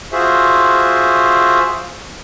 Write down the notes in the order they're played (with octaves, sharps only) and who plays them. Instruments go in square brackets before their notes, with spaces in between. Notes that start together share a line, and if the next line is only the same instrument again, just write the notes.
[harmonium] F4 F#4 G#4 C5 E5